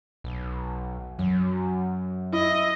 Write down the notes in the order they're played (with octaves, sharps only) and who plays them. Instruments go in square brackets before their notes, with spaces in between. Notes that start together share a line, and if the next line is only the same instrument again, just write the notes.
[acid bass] B1
[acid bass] F#2 [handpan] F#3
[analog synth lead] E4 [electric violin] D#5